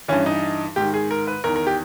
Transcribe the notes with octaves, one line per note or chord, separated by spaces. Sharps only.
G2 E3 C#4
D#4
G#2 D#3 G4
G#4
A#4
B4
E2 D#3 A#4
A#4
G4